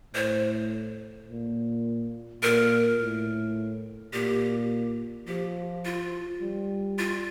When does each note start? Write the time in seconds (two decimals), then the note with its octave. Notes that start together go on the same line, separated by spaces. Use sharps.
0.15 A2 C5
1.29 A#2
2.43 A#2 A#4
3.00 A2
4.13 A#2 G4
5.27 F3 G4
5.85 F4
6.41 G3
6.99 F4